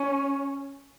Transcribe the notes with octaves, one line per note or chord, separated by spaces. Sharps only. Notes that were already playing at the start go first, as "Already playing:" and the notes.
Already playing: C#4